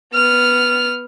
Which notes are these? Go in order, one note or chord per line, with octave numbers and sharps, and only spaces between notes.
B3 F6